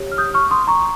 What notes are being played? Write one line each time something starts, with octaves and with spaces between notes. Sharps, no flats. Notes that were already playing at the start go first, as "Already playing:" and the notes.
Already playing: G4 C#5
F6
D#6 G6
C#6 F6
C6 D#6
A#5 C#6